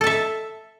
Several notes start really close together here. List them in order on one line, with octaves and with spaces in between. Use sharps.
A4 A5 E5